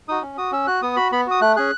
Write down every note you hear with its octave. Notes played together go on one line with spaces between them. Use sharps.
D#4 F#4 D#6
C#4
F#4 D#6
C#4 E6
F#4 F#6
B3 D#6
F#4 B5
B3 B5
F#4 D#6
A3 F#6
C#4 G#4 F#6